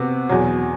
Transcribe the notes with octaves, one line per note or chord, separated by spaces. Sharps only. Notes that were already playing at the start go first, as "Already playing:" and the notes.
Already playing: C3 B3 F#4
E2 B2 F#3